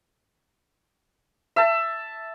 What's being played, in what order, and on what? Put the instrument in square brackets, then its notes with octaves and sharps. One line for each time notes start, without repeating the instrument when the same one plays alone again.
[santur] E5 A5